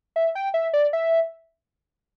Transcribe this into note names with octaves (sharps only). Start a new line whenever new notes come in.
E5
G5
E5
D5
E5